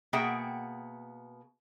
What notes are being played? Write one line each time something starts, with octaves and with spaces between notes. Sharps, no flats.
B2 A#3 G#4 E5 F#5 G5